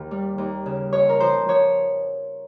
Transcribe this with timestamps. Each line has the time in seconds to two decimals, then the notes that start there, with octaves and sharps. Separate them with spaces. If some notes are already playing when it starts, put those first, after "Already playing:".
Already playing: D#2
0.11 G3
0.38 D#2
0.66 C#3
0.93 F2 C#5
1.09 A#4
1.20 F3 C5
1.48 F3 C#5